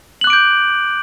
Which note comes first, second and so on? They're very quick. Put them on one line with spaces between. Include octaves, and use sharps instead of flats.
F#7 F#6 D6 D7 G6